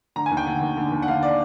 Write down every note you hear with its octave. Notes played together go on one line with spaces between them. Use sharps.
D3 A#5
G#5
D#2
G5
D3 F#5
D#2
D3
D#2
F#5
D3 F5
D5